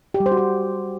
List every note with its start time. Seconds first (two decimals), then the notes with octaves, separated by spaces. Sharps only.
0.14 G4
0.20 G3
0.26 C5
0.32 F#4
0.37 C5